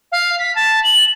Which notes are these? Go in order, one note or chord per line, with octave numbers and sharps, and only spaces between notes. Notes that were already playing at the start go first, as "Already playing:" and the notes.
F5
B6
A5
F#7